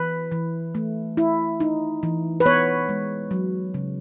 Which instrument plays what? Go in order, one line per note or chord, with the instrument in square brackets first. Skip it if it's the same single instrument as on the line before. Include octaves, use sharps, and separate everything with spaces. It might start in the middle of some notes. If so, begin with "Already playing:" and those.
Already playing: [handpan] E3 B4
E3
A3
E4
D#4
E3
B4
B3 C#5
G#3
F#3
C#3